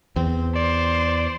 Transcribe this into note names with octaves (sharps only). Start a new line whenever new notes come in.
E2 C4
C5 D5